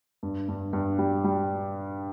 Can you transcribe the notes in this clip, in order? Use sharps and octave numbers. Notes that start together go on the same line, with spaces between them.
G2
G2
G2
G3
G3